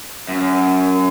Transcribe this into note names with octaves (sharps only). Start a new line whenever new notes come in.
F#2